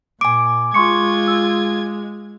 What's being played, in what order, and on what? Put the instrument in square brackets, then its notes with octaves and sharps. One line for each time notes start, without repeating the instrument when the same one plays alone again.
[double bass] A#2 [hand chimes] G#5 D6 [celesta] D7
[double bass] G#3 [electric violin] F4 G#6 [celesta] C6 C#6 C#7
[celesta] E6